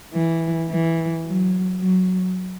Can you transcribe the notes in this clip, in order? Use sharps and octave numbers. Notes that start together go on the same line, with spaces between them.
E3
E3
F#3
F#3